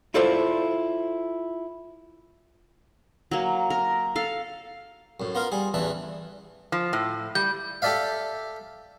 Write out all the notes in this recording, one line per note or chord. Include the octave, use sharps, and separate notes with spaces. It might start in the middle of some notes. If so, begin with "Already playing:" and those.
E4 F4 A4 C5 D5
F#3 A#3
A#4
A4 F5
F#2 A2
B3 F4 A#4 F5
G3 G#4
A1 E2 E3 D4 E5 A5
F3
A2
G3 G6
G4 A4 D5 E5 F5